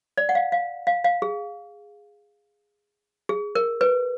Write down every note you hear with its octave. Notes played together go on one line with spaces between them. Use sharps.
D5
F#5
F5
F5
F5
F5
G#4
G#4
A#4
B4